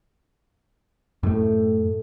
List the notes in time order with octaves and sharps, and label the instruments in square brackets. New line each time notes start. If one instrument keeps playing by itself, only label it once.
[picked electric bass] F#2 A3 [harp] A2